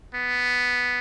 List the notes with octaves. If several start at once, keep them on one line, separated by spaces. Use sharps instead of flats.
B3